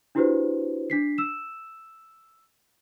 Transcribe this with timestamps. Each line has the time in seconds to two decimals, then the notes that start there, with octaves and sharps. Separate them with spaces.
0.15 D4 E4 F#4 G4 B4 C5
0.90 D4 B6 C7
1.18 E6 E7